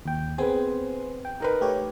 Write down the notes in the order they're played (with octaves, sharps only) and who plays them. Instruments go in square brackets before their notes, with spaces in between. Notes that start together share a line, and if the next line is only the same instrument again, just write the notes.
[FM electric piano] D#2 G5
[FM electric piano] B3 C4 C5 [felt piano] G#4 B4
[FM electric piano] G5
[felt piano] D#4 A#4 B4
[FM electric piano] A3 G4 C#5